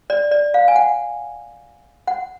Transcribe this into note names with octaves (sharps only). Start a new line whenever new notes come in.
D5
D5
F5
G#5
F#5
F#5